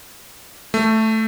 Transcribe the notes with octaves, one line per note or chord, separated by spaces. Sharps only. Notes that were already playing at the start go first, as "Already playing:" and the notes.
A3